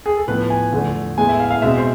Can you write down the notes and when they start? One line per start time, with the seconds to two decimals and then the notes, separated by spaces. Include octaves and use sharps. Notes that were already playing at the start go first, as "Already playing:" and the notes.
0.06 G#4
0.17 A4
0.28 A2 F3 B3 B4
0.50 G#5
0.73 E2 D3 F3 A3
1.18 A2 E3 G#3 B3 G#5
1.29 E5
1.40 F5
1.51 F5
1.62 B2 G#3 C4 E5
1.78 C5